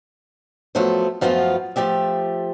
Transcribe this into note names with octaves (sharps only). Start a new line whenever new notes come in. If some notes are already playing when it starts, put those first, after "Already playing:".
F3 F#3 A3 B3 A4 C5
F#2 F3 A3 B3 F4
F3 A3 G4 E5